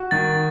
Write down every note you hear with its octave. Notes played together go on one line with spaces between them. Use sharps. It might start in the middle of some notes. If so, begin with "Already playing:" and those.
Already playing: F#4
D#3 A6